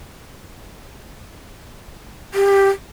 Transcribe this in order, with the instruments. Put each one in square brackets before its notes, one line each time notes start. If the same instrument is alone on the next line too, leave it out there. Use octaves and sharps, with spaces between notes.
[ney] G4